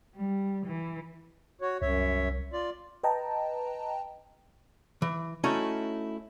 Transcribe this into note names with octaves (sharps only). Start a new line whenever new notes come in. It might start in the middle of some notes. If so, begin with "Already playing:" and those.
G3
E3
F#4 C#5
C2 F#2 C#5 E5
F4 D5
B4 D#5 G5 A5 A#5
E3
A3 C#4 D#4 E4 F#4